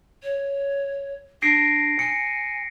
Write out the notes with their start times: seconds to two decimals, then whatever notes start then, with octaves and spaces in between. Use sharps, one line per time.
0.23 C#5
1.42 D4 A#6 C7 D7
1.99 G#5 C#7